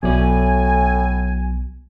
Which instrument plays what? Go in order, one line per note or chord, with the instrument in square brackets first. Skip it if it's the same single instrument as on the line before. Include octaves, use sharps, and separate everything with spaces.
[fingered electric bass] B1 B3 [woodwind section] A2 G#5 [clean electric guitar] F#3 D5